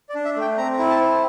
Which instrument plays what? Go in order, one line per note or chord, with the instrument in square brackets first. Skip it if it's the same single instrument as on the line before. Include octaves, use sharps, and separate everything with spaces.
[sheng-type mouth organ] D5
D4
E5
A3 G5
C4 A#5
E4
A5
C4